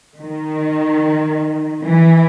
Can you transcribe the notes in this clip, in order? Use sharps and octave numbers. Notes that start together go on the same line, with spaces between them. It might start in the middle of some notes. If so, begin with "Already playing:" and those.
D#3
E3